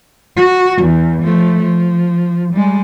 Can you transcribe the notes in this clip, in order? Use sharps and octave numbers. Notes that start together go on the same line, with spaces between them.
F#4
E2
F3 A3
F3
G3 G#3